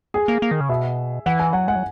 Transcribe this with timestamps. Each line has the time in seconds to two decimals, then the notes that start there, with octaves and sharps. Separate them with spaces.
0.14 G#4
0.28 A#3
0.42 A#3
0.51 D#3
0.61 C#3
0.69 B2 E5
1.26 E3 F#5
1.40 G#5
1.53 F#3 F#5
1.68 G#3 F#5
1.76 F#3